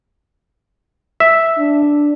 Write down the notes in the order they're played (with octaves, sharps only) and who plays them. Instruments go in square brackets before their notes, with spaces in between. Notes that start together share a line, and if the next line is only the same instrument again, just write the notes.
[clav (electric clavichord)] E5
[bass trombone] D4